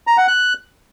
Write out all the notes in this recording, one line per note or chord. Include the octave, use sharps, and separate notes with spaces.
A#5
F#5
F#6